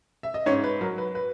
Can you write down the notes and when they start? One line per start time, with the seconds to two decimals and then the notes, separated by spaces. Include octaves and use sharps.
0.23 E5
0.34 D#5
0.46 G#2 C#4 C#5
0.64 B4
0.81 F#3 A#4
0.98 B4
1.15 B4